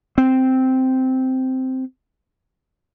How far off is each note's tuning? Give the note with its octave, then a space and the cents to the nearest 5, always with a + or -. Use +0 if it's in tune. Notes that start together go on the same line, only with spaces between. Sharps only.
C4 -10